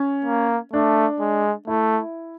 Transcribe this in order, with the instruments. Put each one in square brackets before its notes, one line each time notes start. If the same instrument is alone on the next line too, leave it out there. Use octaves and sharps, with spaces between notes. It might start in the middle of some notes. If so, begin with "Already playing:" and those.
Already playing: [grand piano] C#4
[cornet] A#3
[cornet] A3 [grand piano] D4
[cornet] G#3
[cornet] A3 [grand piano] E4